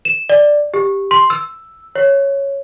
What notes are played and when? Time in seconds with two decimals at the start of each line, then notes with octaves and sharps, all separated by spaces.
0.05 E7
0.29 D5
0.74 G4
1.11 C6
1.30 E6
1.95 C#5